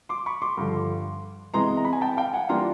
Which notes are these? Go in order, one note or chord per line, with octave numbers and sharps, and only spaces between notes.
C6 D6
B5 C#6
C6 D6
G2 D3 F3
C3 E3 G#3 B3 A#5 C6
A#5
B5
G#5 A#5
G5 A5
F5 G5
F#5 G#5
E3 G3 A#3 D4 F4 A#5 C6